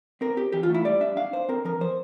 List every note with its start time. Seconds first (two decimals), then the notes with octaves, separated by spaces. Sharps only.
0.21 C4 A#4
0.37 C4 G4
0.52 E3 G4
0.63 F4
0.69 A3
0.74 E4
0.85 G3 D5
1.01 D4 E5
1.17 D4 F5
1.33 D4 C5
1.49 C4 A#4
1.65 F3 A#4
1.81 F3 C5